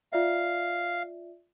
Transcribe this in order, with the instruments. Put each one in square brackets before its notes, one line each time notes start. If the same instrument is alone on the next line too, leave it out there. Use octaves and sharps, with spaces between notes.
[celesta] F4 D5 E5 [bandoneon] F5